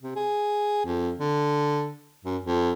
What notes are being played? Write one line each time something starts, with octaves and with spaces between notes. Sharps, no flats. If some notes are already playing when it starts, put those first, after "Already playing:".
C3
G#4
F2
D3
F#2
F2